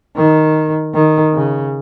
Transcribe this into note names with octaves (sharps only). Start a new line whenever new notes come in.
D#3
D#3
C#3